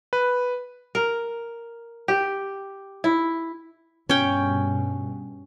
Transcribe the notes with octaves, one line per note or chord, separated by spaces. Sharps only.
B4
A#4
G4
E4
G2 B2 C#4 G5